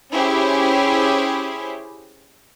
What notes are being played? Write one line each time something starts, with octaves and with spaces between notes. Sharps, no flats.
C#4 E4 G4 G#4 C5